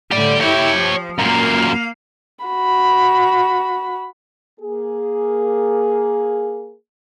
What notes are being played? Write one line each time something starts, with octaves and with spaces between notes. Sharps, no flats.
A2 D3 G4 D5
E4 G4 C#5 G5
F3
F#2 A#2 A#3 F5
F#4 B5
A#3 G#4